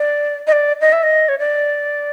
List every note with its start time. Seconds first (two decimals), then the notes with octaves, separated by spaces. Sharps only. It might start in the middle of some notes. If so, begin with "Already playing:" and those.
Already playing: D5
0.47 D#5
0.52 D5
0.81 D#5
0.93 E5
1.03 D#5
1.29 C#5
1.39 D5